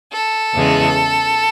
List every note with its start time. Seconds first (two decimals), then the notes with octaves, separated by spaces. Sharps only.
0.13 A4
0.54 E2 C#3 E3 G#3